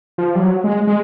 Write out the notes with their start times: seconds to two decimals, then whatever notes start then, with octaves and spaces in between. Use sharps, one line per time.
0.18 F3
0.35 G3
0.41 F#3
0.64 G#3
0.87 G#3